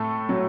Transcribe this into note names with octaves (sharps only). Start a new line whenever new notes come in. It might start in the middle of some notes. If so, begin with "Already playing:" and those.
Already playing: A2 A3 A4
F#3